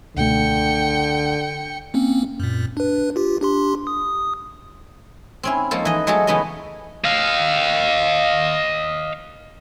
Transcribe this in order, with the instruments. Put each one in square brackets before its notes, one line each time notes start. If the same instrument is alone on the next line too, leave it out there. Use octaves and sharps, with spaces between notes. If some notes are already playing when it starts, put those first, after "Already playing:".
[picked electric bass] C#2 B2 A3 [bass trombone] D3 [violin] G5 C#7
[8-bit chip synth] A#3 C4 C#4
F#2 A#2
D4 B4
F4 G4
D4 G4 C6
D#6
[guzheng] C4 C#4 E4
F3 G#3 A#3 C#4 A4 C5
E3 D#5
F#3 G#3 A3 G#4 A4
C#3 E3 A3 B3 C#4 D#5
[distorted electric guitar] D#5 F5